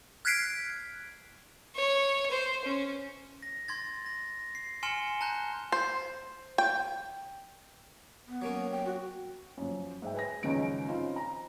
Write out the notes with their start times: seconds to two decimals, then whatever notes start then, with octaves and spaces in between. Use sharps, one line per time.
0.25 F6 F#6 G#6 B6 C7 D7
1.76 C#5
2.31 C5
2.65 C#4
3.42 A#6
3.68 C6 G#6 A6
4.06 A#6
4.55 C7
4.83 G#5 C6 F6 C#7 E7 G7
5.21 A5 A#5 F#6 G6 G7
5.72 C5
6.58 G5
8.28 B3
8.42 F#3 A#3 C#4
8.71 G5
8.86 F#4
9.58 F#2 F3
10.02 G#2 E5 G5
10.14 B4 G#5 A#6
10.43 C#2 F#2 D#3 F3 D7
10.88 C4 C#4 D#4 F4
11.16 A#5